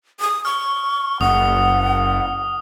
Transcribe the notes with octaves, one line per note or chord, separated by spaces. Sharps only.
D#6
C#6 F6
F#1 F#5 D#6